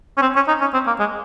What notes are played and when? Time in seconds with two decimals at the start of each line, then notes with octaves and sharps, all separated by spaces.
0.17 C#4
0.22 C4
0.36 C#4
0.48 D#4
0.61 C#4
0.74 C4
0.87 A#3
0.99 G#3